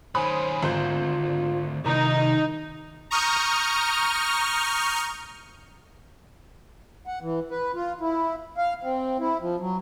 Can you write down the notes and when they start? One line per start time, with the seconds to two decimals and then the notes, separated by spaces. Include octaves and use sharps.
0.15 D#3 C#4 C5 G#5 B5 D#6
0.63 G#1 D2 F4 C5 G6
1.86 C2 D#3 D#4 A#5
3.11 A#5 C#6 D#6 F6 G6
7.07 F#5
7.22 E3
7.51 B4
7.75 F4
8.01 E4
8.57 F5
8.83 C4
9.20 E4
9.40 F3
9.60 F#3